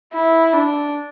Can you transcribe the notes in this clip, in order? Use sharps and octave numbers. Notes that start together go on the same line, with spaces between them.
E4
D4